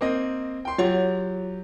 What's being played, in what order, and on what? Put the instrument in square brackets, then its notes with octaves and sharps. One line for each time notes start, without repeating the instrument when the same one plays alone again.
[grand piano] A#3 C4 D#5
G5 C6
[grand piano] F#3 G4 [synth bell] F4 C#5 F#5